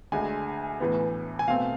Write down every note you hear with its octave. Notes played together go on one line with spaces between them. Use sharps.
D2 D3 G#3 G#5
A2 E3 B3
G#5
B2 A3 C4 F5